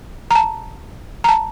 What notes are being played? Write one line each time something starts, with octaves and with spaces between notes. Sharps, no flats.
A#5
A5
A#5
A5